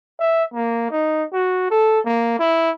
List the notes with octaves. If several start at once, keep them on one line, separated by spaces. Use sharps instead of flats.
E5
A#3
D#4
F#4
A4
A#3
E4